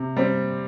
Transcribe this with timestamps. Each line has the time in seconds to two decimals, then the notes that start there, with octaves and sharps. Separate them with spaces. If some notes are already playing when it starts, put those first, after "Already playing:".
Already playing: C3
0.16 G3 C4